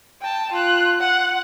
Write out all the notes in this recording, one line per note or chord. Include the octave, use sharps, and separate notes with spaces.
G5 A5
F4 F#6
F#5